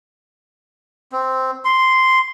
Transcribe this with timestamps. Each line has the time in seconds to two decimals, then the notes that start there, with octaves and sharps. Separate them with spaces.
1.12 C4
1.65 C6